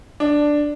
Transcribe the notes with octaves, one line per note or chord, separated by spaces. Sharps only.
D4